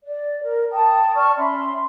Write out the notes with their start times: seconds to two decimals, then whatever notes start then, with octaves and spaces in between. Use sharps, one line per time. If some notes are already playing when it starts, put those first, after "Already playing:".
0.04 D5
0.42 A#4
0.71 G5 A5 D#6
1.15 D5 A5 C#6 F6
1.38 C#4 E5 B5 C6